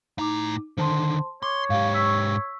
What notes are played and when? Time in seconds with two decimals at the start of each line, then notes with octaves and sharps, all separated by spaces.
0.18 A2 D#4 A#5 D6
0.78 D3 D#3 C5 A5 C6
1.43 C#5 C6 D6
1.70 G#2 G4 F5
1.93 C#6 E6 B6